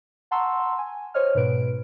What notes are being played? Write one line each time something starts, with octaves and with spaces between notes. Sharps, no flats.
F#5 A5 A#5 C6 C#6 E6
G#5
C5 C#5 D#5 F6
G#2 B2 B4 D7